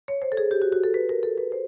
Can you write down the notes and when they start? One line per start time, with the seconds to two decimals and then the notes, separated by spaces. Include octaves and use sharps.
0.08 C#5
0.22 C5
0.32 A4
0.37 G#4
0.51 G4
0.62 F#4
0.72 F#4
0.84 A4
0.94 B4
1.09 A#4
1.23 A4
1.38 B4
1.52 C5